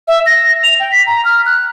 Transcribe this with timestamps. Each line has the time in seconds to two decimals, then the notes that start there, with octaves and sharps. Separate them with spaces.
0.08 E5
0.26 A#6
0.64 F7
0.80 G5
0.92 B6
1.07 A#5
1.25 F6
1.46 F#6